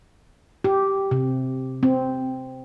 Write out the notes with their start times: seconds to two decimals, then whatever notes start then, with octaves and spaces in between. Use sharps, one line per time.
0.64 G4
1.11 C3
1.83 C4